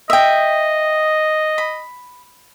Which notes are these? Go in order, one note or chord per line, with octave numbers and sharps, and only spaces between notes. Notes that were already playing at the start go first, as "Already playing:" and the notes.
D#5 E5 G5
B5